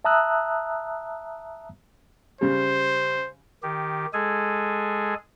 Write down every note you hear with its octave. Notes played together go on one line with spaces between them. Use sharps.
E5 A5 A#5 D#6 E6 F#6
C#3 G3 C5
D#3 G4
G#3 G#4 A4 G#5